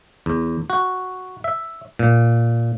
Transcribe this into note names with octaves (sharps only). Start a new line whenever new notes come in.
E2
F#4
E5
A#2